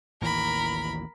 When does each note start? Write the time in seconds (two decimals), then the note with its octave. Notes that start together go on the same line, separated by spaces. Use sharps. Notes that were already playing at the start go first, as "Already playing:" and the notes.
0.21 A1 D#2 E3 A#4 B5